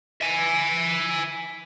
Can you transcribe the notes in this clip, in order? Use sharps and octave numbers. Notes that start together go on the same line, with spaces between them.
E5 G#5